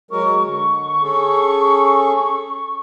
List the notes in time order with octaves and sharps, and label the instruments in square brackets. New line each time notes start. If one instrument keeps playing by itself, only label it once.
[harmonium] F#3 G#3 A#4 [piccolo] C#6
[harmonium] D3 [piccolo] C#6
[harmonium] C#4 G#4 A4